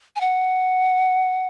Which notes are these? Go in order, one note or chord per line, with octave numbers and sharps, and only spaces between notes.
G#5
F#5